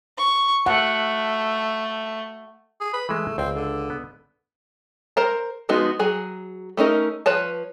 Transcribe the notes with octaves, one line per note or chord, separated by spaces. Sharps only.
C#6
A3 F#5
G#4
B4
E3 G#3 A3
C#2 C4
D3
B3
A#4 C5 A#5
F3 G#3 B3 D#4 F#4
F#3 G#4 G#5
A3 C#4 D#4 A#4
F3 B4 C#5 A5